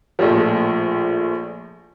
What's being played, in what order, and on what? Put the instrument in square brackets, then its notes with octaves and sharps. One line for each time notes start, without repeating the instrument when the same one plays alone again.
[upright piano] A#1 A2 F3